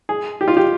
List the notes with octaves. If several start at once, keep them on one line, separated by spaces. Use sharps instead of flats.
G#4
G4
F4
G4